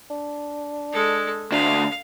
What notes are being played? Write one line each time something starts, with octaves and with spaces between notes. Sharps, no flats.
D4
G#3 A4
D2 D4 F5